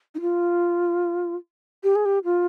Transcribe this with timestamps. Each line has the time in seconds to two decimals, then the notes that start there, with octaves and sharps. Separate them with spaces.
0.15 D#4
0.21 F4
1.84 G4
1.95 G#4
2.05 G4
2.24 F4